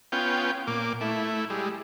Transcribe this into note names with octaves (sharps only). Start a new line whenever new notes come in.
B3 C#4 F4 G5
A#2 A#3 D6
A3 E4
G3 G#3